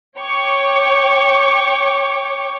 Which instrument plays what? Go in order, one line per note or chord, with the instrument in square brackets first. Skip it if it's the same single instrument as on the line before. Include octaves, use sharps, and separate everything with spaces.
[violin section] C#5 G5 C#6 D6